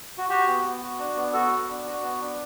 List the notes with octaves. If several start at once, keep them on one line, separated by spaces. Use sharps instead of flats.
F#4
F#4 G4
B3
B3
F#4
D4
B3
F#4 A4
B3
D4
F#4
B3
D4